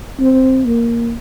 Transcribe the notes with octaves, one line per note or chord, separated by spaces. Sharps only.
C4
A#3